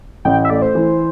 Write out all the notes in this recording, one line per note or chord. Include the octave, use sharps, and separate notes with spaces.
A1 G5
E5
A3 D5
C5
E3